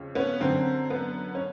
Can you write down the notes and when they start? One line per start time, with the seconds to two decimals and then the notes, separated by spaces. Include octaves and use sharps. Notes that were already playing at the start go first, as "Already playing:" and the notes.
Already playing: F2 C#3
0.15 B3 C#4
0.40 F#2 D3 C4
0.90 B3
1.35 C#4